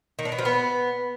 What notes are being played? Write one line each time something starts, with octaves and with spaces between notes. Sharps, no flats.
D#3
D4
B3
F3
B3